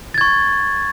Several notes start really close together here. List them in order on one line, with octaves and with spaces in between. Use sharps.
A6 G#6 C#6